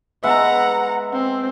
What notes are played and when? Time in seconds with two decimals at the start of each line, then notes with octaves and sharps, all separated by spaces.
0.23 G#3 B3 E5 F#5 A#5
1.13 C4